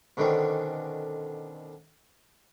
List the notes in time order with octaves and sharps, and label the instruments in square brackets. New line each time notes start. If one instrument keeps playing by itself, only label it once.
[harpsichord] B2 D3 D#3 C4 C#4